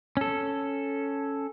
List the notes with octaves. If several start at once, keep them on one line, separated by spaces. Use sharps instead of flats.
C#4 A4